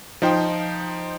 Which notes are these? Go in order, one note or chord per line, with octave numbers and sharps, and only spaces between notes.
F3 D#4 C5 G5